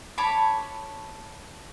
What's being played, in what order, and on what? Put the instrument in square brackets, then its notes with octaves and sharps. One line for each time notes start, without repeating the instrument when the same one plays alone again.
[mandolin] C#5 A5 B5 D6